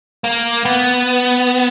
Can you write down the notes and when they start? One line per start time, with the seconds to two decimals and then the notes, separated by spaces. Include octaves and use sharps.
0.24 A#3
0.65 B3